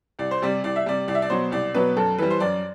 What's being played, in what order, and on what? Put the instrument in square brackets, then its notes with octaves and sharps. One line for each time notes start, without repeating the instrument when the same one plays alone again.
[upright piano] C2 D5
C5
C3 G3 D5
C2 D5
E5
C3 G3 D5
C2 D5
E5
D5
B2 F#3 C5
C2 D5
B2 F#3 B4
F#2 A4
E3 G3 B4
C5
F#2 D5